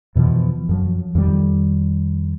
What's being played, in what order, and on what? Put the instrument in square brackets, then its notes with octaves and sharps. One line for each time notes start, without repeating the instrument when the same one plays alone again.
[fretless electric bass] F2 B2 E3 F3
F#2 F3 F#3
F2 D#3 G3